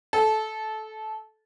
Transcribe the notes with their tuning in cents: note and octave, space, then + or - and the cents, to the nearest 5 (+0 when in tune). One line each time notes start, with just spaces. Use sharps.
A4 -20